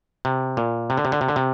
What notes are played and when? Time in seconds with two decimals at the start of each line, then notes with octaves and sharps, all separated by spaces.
0.25 C3
0.57 A#2
0.90 C3
0.97 D3
1.05 C3
1.12 D3
1.21 C3
1.28 D3
1.36 C3